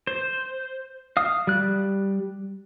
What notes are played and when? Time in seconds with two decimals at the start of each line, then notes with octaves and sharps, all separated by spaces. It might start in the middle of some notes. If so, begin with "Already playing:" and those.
0.07 C5
1.17 F5 D#6
1.47 G3 F#6